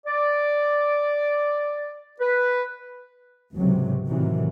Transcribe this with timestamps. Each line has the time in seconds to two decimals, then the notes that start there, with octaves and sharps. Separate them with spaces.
0.07 D5
2.20 B4
3.54 G#1 C#2 C3 F#3
4.07 A2 C3 D#3 E3 F#3